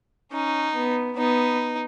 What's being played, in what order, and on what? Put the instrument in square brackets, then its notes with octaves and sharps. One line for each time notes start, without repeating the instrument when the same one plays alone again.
[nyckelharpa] C#4 [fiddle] D#4
[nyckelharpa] B3
[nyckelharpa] B3 [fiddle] D#4